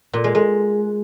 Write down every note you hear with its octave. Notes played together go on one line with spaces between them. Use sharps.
A#2
G#3
G#3